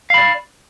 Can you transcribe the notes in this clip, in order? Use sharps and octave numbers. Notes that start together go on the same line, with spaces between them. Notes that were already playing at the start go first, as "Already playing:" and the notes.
D5 F5 B5